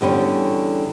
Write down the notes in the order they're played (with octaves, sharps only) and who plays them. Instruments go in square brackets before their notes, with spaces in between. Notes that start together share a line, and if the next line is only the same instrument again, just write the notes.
[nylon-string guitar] E2 D3 G3 C#4